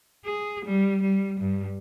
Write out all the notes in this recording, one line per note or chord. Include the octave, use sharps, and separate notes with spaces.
G#4
G3
G3
G2